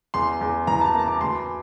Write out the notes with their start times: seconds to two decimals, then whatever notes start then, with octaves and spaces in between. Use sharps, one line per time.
0.14 E2 C6
0.41 E2
0.67 E3 A#5
0.81 A5
0.94 A#3 A#5
1.08 D6
1.21 D2 C6